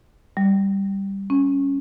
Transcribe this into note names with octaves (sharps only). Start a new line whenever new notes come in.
G3
C#4